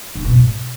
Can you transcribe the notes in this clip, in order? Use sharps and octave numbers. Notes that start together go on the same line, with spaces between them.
D3
B2
G#2